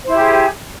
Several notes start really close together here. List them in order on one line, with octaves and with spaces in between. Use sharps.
C5 E4 G4 G#4